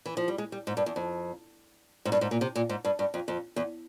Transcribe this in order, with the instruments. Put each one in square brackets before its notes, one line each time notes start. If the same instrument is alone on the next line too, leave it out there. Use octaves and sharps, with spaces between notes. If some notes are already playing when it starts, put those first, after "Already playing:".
[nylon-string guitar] E3
F3
G3
G#3
G3
G#2
G2
E2
F2
G#2
G2
G#2
A#2
C3
A#2
G#2
G2
G2
F2
F2
E2